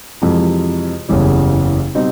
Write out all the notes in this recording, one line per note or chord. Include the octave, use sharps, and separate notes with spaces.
F2 C3 E3 G#3
F#1 E2 C#3 E3 G3
B2 G3 C4 D#4